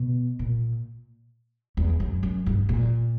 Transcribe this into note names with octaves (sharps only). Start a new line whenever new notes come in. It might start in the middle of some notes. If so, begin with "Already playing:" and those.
Already playing: B2
A#2
E2
F#2
F#2
G2
A#2